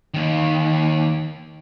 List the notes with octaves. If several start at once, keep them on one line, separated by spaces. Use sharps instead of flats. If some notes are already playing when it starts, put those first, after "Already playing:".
D#2 D#3